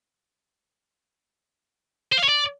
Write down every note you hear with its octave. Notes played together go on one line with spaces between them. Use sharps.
C5
F5
C#5
D5